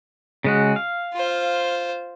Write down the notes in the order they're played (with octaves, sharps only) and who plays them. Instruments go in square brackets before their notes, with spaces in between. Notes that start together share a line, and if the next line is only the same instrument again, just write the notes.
[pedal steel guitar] C#3 G#3 F#4
F5
[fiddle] F4 C5